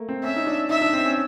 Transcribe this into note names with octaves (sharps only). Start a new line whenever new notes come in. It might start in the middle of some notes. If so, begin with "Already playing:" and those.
Already playing: A3 A#3
C4
C#4 E5
D#4
D4
D#4 E5
D4
C4
C#4